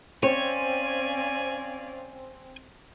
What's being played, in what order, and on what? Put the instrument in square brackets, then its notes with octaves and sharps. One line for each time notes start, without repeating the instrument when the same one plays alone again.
[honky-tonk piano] C4 [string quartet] C#4 D5 F5 [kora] C#5 [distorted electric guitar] G#5